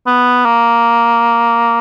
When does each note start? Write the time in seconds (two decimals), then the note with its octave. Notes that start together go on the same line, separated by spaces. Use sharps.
0.07 B3
0.46 A#3